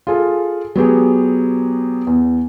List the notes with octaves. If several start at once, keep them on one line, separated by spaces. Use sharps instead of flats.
F4 G#4 A4
F#3 B3 G4 G#4
E2